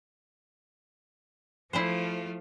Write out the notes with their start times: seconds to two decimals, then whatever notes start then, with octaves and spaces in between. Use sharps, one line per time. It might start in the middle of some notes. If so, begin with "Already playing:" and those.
1.73 F3 A3 E4 F4 G#4 C5